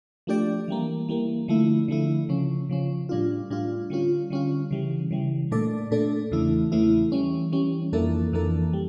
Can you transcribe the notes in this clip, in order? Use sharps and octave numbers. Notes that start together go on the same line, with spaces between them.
F3 A3 D4 G4 D5
E3 G3 A#3
E3 G3 A#3
D3 F3 A3 E4
D3 F3 A3 E4
C#3 F3 C#4
C#3 F3 C#4
A2 G3 D4 F4
A2 G3 D4 F4
D3 G3 C#4 F4
D3 G3 C#4 F4
C#3 E3 G3
C#3 E3 G3
A#2 A3 D4 A4 D5
A#2 A3 D4 A4 D5
E2 C#3 E3 A3 E4
E2 C#3 E3 A3 E4
E3 G3 C#4
E3 G3 C#4
F2 E3 A#3 D4 A4
F2 E3 A#3 D4 A4
G3